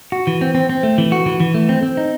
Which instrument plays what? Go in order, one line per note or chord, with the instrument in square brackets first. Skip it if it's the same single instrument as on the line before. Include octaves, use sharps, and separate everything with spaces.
[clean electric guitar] F#4
E3
C4
C4
C4
A3
E3
F#4
E3
E3
A3
C4
C4
D#4